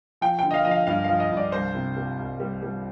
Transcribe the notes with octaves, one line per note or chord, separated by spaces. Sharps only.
F3 G5
D3 G5
D#5
F5
F3 D#5
F5
G2 F5
F3 F5
D#5
G2
D5
C2 C5
C3
G3
C2
G3
G3